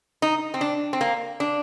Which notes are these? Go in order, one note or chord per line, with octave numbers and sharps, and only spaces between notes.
D#4
C4
D4
C4
A#3
D4